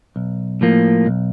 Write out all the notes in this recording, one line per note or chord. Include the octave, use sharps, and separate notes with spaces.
B1
A2 F3 A#3
B1